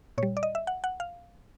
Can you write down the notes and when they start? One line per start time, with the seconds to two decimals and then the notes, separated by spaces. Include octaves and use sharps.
0.18 A#2 C#5
0.23 G3
0.37 D5
0.43 D#5
0.55 E5
0.67 F#5
0.84 F#5
1.00 F5